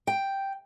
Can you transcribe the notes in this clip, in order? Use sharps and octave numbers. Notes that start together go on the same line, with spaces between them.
G5